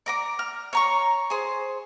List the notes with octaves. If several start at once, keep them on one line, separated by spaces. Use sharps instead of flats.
D5 A#5 D6
F6
C#5 A#5 C#6
G#4 C5